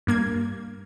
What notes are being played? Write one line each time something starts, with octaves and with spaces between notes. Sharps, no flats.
G2 A#3 G#6